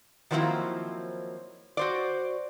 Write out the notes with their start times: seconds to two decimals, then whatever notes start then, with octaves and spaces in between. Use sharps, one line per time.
0.31 D#3 F3 F#3 A#3 C4 E4
1.77 F#4 C5 D5